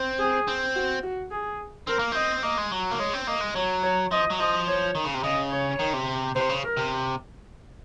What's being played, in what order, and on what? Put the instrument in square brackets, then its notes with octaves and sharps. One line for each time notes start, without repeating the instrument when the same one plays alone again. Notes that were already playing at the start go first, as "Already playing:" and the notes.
Already playing: [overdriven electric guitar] C4
[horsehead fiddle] G#4
[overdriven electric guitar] C4
[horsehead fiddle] F#4
F#4
G#4
[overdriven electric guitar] C4 [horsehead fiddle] A#4
[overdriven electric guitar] A#3
[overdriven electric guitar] C4 [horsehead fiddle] D#5
[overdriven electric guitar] A#3 [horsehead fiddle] D#5
[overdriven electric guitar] G#3
F#3
A#3
[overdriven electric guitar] G#3 [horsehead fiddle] C#5
[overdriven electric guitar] C4
[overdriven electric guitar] A#3 [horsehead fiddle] D#5
[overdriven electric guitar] G#3
[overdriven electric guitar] F#3 [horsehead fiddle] C#5
[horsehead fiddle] C#5
[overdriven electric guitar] F3 [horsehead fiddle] D#5
[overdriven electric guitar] F#3
[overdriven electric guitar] F3 [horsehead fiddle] D#5
[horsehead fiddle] C#5
[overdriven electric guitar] D#3
C#3
C3
[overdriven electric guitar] C#3 [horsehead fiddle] D#5
[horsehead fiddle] C#5
[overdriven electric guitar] D#3
C3
[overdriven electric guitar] C3 [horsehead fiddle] C5
[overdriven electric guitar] C#3
[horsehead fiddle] A#4
[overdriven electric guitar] C3